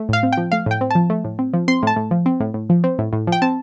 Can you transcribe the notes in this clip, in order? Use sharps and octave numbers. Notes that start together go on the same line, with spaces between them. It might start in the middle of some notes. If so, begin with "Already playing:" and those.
Already playing: A3
A2 F5
C4
F3 G5
A3 F5
A2 G5
C4
F3 A5
A3
A2
C4
F3
C4 C6
A2 A5
A2
F3
C4
A2
A2
F3
C4
A2
A2
F3
G5
C4 A5